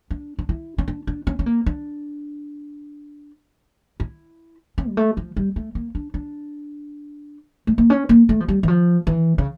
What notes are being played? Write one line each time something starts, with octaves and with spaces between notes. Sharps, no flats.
D4
D4
E4
C#4
D4
D4
C#4
C#4
A#3
D4
E4
C#4
G3
A3
F3
G3
A3
A#3
D4
D4
A3
A#3
C#4
A#3
A3
F3
G3
E3
F3
E3
C#3